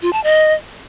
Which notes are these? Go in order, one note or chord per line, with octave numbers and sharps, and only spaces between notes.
F4
A5
D#5